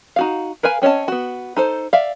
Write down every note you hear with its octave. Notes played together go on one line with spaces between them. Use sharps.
D#4 F#4 F5
A#4 B4 F5 G#5
C4 C#4 C#5 D#5 A5
B3 F#4
D#4 A4 C5
D5 E5 F5